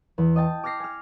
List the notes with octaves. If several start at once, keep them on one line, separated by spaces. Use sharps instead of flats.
E2
D#5 G5 A5
D6 F6 A6 A#6 C7 C#7
G#5 F6